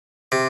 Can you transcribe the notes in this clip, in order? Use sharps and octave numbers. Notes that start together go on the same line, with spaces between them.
C3